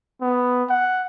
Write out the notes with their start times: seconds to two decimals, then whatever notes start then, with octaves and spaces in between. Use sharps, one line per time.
0.21 B3
0.70 F#5